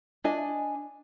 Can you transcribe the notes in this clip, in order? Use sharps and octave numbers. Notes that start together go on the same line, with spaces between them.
D4 D#5 G#5